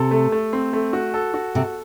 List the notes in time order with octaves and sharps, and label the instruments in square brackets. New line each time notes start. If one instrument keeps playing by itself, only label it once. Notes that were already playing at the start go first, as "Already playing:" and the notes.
Already playing: [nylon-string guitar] C3 [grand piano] A4
[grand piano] A3
A3
C4
A3
F#4
A4
F#4
[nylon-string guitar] C3 [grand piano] A4